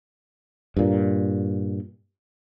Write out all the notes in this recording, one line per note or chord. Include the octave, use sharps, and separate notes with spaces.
G2 A#2